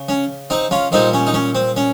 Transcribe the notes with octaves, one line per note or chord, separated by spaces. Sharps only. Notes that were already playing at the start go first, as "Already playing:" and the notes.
Already playing: C#3
C#4
C4 D#4
C#4 F4
A#2 G3 C4 D#4
C#4
D#4
C#4
C4
C#4